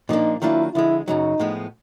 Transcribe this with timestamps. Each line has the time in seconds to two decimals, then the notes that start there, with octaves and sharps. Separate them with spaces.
0.09 A#2 F3 A#3 D4 D#4
0.42 D#3 F#3 A#3 D4 E4 F4
0.74 D3 F3 G#3 E4
1.08 F#2 C#3 F#3 D#4
1.40 A2 F3 G#3 B3